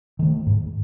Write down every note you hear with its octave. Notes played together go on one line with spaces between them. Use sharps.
D#3 A3
G#2